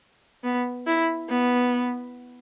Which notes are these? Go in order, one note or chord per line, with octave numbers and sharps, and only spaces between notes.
B3
E4
B3